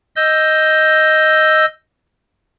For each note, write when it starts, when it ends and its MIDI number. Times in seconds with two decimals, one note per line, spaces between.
0.16 1.65 75
0.16 1.65 88
0.16 1.65 91